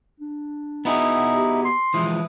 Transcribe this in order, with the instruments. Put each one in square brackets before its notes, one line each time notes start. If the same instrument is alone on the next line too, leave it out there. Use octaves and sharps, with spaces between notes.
[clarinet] D4
[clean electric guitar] B3 F#4 G#4 [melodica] D#4 E4
[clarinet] G4
C6
[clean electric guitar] E3 F3 G#3 [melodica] E4 B4 D#6